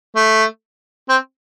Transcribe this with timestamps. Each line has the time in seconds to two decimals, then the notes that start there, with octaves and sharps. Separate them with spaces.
0.16 A3
1.09 C4